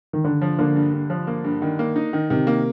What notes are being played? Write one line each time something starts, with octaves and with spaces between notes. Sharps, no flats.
D#3
G2 D3
F3
D3 A#3
G2
G2
F3
A#3
G2
D#3
A#3
D#4
D#3
C3 D#3
A#3